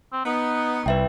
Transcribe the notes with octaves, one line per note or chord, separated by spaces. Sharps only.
C4
B3 D#4
C2 B4 E5 G5